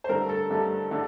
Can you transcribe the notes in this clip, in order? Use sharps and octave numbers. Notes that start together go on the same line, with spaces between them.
C5
G2 D3 A3 A#4
A4
G2 D3 A3
D3 A3